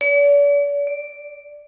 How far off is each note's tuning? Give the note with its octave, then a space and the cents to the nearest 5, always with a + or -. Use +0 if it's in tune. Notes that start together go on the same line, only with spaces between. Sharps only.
D5 -45
D5 +0